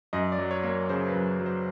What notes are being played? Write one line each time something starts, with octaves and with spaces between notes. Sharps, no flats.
F#2 D#5
D5
F#3
C#5
A#3
C#5
C#3 C5
B4
F#2
F#3
C5